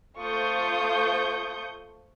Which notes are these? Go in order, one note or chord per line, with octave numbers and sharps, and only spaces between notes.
A3 F4 C5 C#6 D#6 G6